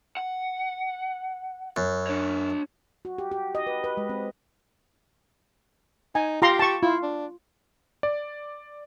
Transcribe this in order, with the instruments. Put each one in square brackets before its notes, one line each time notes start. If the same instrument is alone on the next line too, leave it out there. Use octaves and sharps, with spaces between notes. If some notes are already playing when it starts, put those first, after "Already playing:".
[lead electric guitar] F#5
[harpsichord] F#2
[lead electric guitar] D4 C#5
[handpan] F#4
G4
G4
D#5
B4
B4
G#3
C4
[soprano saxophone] D#4 [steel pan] G#5
[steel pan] F4 A#5 C6 [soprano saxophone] G4
[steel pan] A5 C#6
[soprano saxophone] E4 [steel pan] F4
[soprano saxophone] D4
[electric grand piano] D5